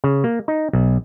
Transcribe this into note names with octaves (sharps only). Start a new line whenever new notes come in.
C#3
A#3
D#4
B1